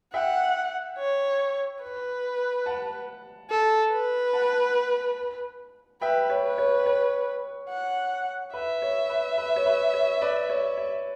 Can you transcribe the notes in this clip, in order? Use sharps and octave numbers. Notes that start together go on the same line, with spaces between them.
E5 F#5 G5
C#5
B4
F#5 A5
A4
B4
F#5 A5
B4 E5 G5
C#5
B4
C#5
C#5
F#5
B4 E5
C#5
B4
B4
C#5
B4
C#5
B4 D5
C#5
C#5